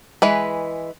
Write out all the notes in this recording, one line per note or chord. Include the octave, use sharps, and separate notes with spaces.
E3 G#3 B4